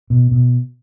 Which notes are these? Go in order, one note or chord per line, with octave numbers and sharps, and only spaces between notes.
B2
B2